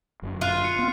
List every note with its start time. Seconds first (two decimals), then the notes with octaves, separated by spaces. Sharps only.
0.22 G1 F#2
0.41 F4 F#6 C7 D#7
0.64 C#7
0.79 B3 C4